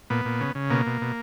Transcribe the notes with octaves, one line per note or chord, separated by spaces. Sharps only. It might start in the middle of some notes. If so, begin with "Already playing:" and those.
A#2 B3
A#2
C#3
C#3
B2 A#3
B2
B2